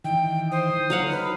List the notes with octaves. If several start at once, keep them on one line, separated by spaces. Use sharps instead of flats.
D#3 E3 G5
C5 D#6
F#3 F5 F#5
D#4 B4